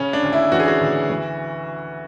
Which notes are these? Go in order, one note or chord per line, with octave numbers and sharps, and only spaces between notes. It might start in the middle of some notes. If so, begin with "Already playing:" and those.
Already playing: C#3 C#4
D4
D2
E4
E3 F#4
G#4
F#4
D2
E3